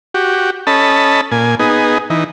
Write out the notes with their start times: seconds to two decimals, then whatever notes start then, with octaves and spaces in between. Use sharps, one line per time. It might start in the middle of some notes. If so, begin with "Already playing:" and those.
0.14 F#4 G4
0.67 C#4 A4 D#5 A5 B5
1.32 A#2 G#5
1.59 B3 D#4 G#4
2.10 E3 D#4